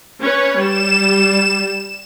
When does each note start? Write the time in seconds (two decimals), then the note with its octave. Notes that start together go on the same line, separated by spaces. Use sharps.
0.22 C#4 B4 C#5
0.59 G3 E7